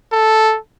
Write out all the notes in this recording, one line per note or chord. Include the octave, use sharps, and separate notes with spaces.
A4